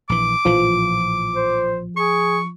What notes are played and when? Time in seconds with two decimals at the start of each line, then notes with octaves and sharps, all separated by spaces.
0.09 A#1 E3 D6
0.45 A#1 A2 E3 F3
1.36 C5
1.97 G#4 C#6